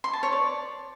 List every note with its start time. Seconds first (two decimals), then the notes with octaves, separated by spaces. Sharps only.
0.04 C6
0.13 A5
0.23 C#5
0.32 D5